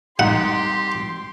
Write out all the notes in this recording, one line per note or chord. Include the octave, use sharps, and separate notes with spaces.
C2 D#4 G4 F#5 A#5 C6